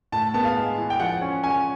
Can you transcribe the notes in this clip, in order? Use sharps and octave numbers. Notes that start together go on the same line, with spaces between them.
A2 A5
B3 A5
F5
G#3
E3
G5
F3 F#5
C#4
C#4 G#5